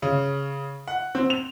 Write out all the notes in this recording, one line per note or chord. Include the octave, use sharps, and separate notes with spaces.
C#3
F#5
C4
F7